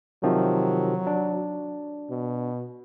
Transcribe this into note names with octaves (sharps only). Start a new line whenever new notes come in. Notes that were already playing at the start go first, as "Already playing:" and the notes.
C3 D#3 F3 F#3
D4
B2